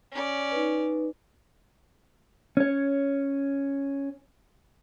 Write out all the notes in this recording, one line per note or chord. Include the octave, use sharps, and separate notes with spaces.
C#4 D5
D#4 B4
C#4 C#5